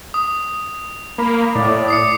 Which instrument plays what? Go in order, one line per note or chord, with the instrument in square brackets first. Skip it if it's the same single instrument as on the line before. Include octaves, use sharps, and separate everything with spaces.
[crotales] D#6
[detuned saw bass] A#3 [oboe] B5
[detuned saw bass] A2 [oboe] D5
[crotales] D#6 C7 C#7